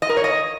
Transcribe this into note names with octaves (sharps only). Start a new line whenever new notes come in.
D#5
A#4
C#5
D#5